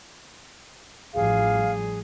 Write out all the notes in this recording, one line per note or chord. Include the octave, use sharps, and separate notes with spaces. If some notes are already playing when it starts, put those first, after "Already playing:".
A1 F3 G3 G#4 F5